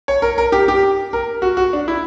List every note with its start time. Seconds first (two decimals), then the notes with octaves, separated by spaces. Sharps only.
0.08 C#5
0.22 A#4
0.38 A#4
0.52 G4
0.68 G4
1.13 A#4
1.42 F#4
1.57 F#4
1.73 D4
1.88 E4